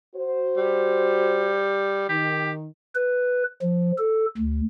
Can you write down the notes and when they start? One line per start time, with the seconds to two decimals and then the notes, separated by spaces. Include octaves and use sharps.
0.16 F#4 C5
0.57 G3
2.09 D#3 G4
2.95 B4
3.62 F3
3.98 A4
4.38 D2